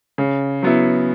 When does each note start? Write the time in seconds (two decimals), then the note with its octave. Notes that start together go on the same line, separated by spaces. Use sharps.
0.18 C#3
0.63 F#3 B3 E4